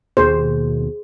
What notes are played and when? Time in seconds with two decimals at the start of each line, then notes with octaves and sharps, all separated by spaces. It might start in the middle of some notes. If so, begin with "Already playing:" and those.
0.17 D#2 B2 G#4 C5